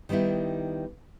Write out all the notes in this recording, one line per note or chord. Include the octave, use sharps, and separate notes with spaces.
D#3 G3 B3 D#4 E4